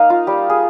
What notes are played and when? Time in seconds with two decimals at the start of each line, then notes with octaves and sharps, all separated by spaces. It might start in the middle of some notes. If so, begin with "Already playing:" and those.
Already playing: A#3 D#4 D#5 F5
0.10 F4
0.27 G3 G4
0.49 G#4